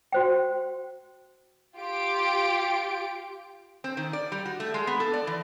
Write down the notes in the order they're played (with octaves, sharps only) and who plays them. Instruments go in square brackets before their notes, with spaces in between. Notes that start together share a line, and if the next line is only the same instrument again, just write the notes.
[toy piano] F#4 C5 G5
[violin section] F4 G4 D7
[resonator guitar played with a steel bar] C4
D#3
D5
G3
F#4
A3
G#3
B3
A4
D5
E3